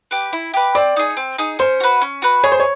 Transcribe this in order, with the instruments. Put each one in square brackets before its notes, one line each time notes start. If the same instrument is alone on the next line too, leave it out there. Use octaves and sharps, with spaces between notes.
[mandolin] G4 B4
E4
G4 B4
[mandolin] C4 [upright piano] D5
[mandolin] D#4 G#4
C4
D#4 G#4
[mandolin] C#4 [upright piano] C5
[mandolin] F#4 B4
C#4
F#4 B4
[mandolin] G#4 [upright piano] C#5
[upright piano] C5
C#5